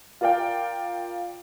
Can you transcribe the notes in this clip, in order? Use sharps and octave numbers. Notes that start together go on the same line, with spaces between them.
F4 A#4 D5 F5 G5